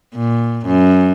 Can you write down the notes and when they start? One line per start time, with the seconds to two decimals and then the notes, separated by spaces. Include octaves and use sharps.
0.16 A#2
0.66 F#2